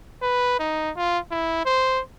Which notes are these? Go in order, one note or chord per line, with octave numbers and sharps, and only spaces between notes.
B4
D#4
F4
E4
C5